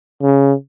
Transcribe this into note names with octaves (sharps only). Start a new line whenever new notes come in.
C#3